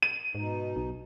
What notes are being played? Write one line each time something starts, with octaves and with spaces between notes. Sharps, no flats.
D#7
G#2 B2 D#4
B1